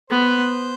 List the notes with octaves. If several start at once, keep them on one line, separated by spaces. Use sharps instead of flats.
B3 C5